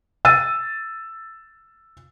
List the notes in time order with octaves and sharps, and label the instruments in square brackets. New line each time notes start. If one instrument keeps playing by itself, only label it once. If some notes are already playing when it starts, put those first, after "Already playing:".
[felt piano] E6 A6 D#7